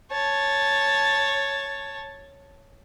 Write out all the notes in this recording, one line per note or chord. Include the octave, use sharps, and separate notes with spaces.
C#5 A5